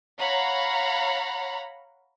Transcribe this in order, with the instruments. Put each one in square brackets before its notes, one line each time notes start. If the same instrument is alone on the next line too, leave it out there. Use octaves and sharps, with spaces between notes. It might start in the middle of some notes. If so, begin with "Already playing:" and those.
[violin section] C#5 F5 F#5 A#5 B5